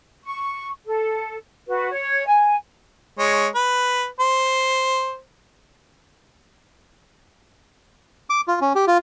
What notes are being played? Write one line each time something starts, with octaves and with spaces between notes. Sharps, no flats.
C#6
A4
F#4 B4
C#5
G#5
G#3 C#5
B4
C5
D6
F4
C#4
G4
F4